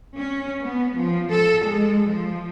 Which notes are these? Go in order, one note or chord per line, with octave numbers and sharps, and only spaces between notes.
C#4
B3
F3
A4
G#3
F3